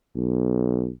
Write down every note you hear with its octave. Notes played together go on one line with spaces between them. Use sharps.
B1